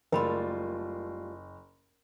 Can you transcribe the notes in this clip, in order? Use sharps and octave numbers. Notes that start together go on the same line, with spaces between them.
F#1 G3 A3 F4 A#4 B5 C6